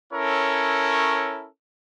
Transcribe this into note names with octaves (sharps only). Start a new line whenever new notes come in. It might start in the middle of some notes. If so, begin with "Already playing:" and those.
C#4 E4 A4 A#4 C#5